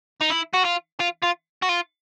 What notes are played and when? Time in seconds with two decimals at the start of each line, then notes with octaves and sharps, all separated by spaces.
0.21 D#4
0.31 E4
0.54 F#4
0.65 F4
1.00 F4
1.22 F4
1.62 F#4
1.69 F4